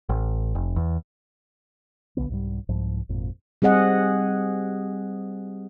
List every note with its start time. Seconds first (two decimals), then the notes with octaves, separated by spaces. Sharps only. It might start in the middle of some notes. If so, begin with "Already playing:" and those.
0.09 A1
0.55 F1
0.76 E2
2.17 B1 G2 D3 B3
2.30 C2 G#2 G3
2.69 C2 G#2 F3
3.09 G#1 F2 A#2
3.62 G3 C4 G#4 D#5 F#5